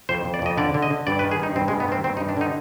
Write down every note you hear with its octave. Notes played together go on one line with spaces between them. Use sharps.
F2 C5
F2
D5
F2 D#5
D3 D5
D3
D#5
D3
G2 D5
B4
D#3
G#4
G2 D#4
G2 C4
G#3
G2
B3
D#3 C4
G2 C4
D#4
G2
D4
D3 D#4